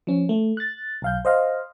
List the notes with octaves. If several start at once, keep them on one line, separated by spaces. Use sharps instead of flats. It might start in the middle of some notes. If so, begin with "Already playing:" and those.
F3 C#4
A3
F#6 A6
B1 F5 G6
C5 D#5 F5